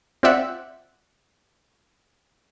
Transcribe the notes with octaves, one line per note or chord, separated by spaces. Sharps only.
C4 F4 D5 E5 F#5